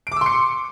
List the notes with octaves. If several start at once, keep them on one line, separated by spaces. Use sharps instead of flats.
C6 D6 E6 C#7 D7